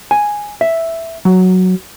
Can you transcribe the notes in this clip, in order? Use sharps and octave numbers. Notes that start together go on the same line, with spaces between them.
G#5
E5
F#3